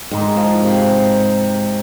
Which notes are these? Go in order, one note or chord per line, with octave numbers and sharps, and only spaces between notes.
G#2 D#3 G#3 D#4
F3
C3